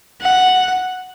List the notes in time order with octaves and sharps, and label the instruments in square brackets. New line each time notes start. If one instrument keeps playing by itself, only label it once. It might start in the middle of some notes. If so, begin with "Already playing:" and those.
[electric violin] F#5